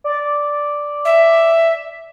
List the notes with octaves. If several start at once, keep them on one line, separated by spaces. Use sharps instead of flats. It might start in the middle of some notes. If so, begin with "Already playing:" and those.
D5
E5